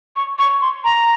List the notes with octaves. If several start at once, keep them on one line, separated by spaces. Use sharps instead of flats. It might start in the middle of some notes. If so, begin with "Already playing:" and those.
C#6
C#6
C6
A#5